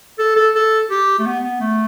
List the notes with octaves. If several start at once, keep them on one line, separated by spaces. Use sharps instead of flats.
A4
A4
A4
G4
A3
B3
B3
A3